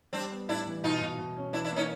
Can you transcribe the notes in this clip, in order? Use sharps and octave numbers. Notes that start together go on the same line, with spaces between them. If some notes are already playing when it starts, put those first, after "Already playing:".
G3 C4 D4
B3
A2 D4 E4
E3
B2 D#4 F4
B2
B2
C#4
E3 D4 E4
D4 E4
A#3 C#4 D#4